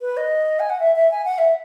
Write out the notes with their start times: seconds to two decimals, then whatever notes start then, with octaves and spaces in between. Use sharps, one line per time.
0.01 B4
0.17 D#5
0.60 G#5
0.70 F#5
0.80 E5
0.95 E5
1.11 G#5
1.25 F#5
1.38 E5